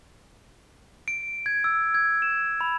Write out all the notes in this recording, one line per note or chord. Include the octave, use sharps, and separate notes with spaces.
D7
G#6
E6
G#6
E7
B5